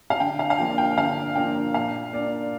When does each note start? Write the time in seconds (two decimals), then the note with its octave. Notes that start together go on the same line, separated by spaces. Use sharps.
0.10 F5
0.20 D3 G5
0.39 F5
0.50 F5
0.58 F3 A#3 D4 G5
0.78 G5
0.97 D3 F5
1.35 F3 A#3 D4 G5
1.74 A#2 F5
2.13 A#3 D4 D5